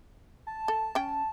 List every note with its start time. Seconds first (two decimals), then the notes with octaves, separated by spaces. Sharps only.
0.47 A5
0.68 A4
0.95 C#4 G5